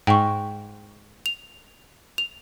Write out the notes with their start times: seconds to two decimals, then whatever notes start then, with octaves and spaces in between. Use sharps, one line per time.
0.07 G#2 G5 C#6
1.26 F7
2.18 F7